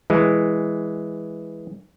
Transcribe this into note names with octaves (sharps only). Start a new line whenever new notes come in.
E3 G#3